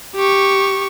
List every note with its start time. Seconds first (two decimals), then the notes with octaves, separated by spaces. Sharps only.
0.16 G4 C#6